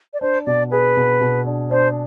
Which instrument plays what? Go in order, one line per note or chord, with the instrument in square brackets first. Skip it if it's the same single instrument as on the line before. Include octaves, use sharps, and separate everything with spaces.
[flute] D5
[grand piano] D4 [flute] C5
[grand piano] B2 [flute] D5
[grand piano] G#4 [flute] B4
[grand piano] B2
B2
D4
[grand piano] D4 [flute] C5